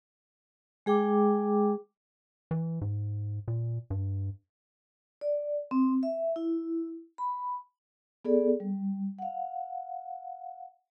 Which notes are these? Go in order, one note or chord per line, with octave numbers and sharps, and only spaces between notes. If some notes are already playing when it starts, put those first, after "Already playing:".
G#3 G#4 G5 D6
E3
G#2
A#2
G2
D5
C4
E5
E4
B5
B3 G#4 A4 D5
G3
F5 F#5